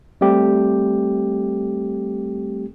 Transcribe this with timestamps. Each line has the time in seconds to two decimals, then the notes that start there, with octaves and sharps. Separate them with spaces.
0.21 G3 A3 C4 G4